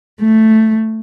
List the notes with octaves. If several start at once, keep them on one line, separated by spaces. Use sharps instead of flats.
A3